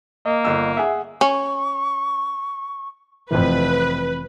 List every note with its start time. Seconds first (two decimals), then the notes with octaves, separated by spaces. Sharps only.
0.26 A#3 D#5
0.45 G1 E6
0.77 G#4 E5 F#5
1.21 C#4 C#6
3.31 F1 F2 E3 C4 B4